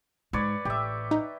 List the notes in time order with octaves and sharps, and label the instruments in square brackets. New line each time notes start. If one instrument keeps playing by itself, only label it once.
[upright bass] G#2 [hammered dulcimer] B4 C#5 D5
[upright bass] A1 [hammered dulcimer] G4 E5
[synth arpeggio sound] D#4